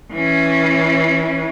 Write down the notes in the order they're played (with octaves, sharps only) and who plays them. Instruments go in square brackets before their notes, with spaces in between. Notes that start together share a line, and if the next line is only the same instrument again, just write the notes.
[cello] E3 C#4